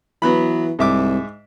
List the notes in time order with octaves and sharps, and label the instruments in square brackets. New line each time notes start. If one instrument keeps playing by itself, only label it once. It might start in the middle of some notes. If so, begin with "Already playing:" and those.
[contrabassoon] E3 [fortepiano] F#3 B3 B5
[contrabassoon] C2 [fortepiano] G#2 E5 D6